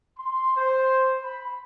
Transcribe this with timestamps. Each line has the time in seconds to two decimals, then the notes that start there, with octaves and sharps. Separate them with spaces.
0.18 C6
0.56 C5
1.23 B5